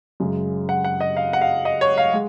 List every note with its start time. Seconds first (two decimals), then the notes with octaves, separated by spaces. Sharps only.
0.20 F#2 C#3 G#3
0.69 F#5
0.84 F#5
1.00 D#5
1.17 F5
1.33 F#5
1.41 F5
1.65 D#5
1.81 C#5
1.98 F5
2.13 G#3